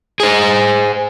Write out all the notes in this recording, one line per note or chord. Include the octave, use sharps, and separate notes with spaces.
G#4 C5